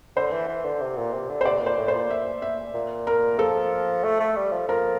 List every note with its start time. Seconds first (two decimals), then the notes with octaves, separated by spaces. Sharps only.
0.16 D3 C5
0.32 E3
0.49 E3
0.65 D3
0.81 C3
0.97 A#2
1.13 C3
1.29 D3
1.41 C5
1.45 C3 D5
1.61 A#2 C5
1.77 A2
1.88 C5
1.94 A#2
2.10 E5
2.42 E5
2.74 A#2
3.07 A#4
3.39 F3 A4
4.04 A3
4.20 A3
4.36 G3
4.52 F3
4.68 F3 A#4